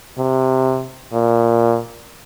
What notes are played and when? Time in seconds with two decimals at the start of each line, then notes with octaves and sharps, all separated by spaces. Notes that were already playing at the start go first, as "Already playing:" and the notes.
0.18 C3
1.13 A#2